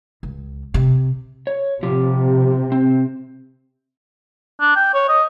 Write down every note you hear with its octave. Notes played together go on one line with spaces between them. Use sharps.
C#2
C3
C#5
C3 F3 F4 G4
C4
D4
G5
C#5
D#5